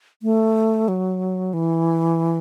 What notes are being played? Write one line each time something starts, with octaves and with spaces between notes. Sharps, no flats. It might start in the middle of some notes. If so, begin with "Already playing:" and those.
A3
F#3
E3